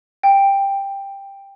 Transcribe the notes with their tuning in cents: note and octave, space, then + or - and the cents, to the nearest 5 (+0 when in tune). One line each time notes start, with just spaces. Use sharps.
G5 +10